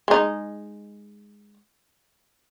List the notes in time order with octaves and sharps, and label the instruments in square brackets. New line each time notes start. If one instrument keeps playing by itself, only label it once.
[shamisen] G#3 D#4